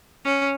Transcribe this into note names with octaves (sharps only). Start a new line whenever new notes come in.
C#4